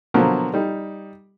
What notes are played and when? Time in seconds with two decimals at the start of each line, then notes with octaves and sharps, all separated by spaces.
0.14 B2 D3 F3 F#3 A#3
0.54 G3 D#4